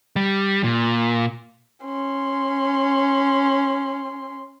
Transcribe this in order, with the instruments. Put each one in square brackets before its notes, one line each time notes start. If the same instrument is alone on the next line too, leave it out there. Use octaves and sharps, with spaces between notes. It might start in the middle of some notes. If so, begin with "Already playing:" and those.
[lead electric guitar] G3
A#2
[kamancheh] C#4 C6